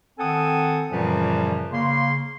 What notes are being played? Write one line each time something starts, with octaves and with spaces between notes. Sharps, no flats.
D#3 C4 A4 F#5 G#5 D#6
F#2 A#2 C#3 E3 F3 G3
C#3 A#3 C6